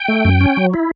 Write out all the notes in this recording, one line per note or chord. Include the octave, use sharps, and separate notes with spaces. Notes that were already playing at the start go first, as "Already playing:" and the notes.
Already playing: G5
A3
F#2
C#4
F#3
E4